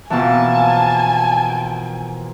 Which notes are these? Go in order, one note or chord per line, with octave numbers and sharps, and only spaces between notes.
B2 E3 F3 A#3 C4 G#5 A5